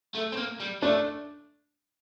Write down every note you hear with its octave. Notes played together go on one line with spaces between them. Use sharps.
A3
C4
A#3
G3
A3 D4